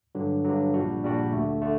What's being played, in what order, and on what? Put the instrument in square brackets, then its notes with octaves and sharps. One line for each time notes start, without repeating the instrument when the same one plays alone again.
[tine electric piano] G2 D3 F#3
G2 D3 F#3
A#1 A#2 G3 D4 F#4
A#1 A#2 G3 D4 F#4
D2 D3 A3
D3 A3